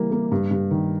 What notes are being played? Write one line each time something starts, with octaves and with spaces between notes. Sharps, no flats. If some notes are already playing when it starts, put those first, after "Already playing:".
Already playing: E3 G3 A#3
A#3
G2
G2
D#3